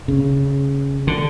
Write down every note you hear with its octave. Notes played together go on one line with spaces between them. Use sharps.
C#3
D3